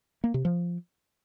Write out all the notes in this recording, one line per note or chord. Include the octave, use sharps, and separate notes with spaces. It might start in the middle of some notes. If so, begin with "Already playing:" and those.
A#3
C3
F3